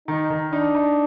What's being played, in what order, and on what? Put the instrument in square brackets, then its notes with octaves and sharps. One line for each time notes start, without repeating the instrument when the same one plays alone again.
[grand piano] D#3 [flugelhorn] D#4
[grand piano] D#3
[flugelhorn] D4 [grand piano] D#4
[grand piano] D#4